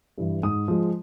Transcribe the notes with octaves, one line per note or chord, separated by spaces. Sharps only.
G2 E3
G#2 D#6
F3 G#3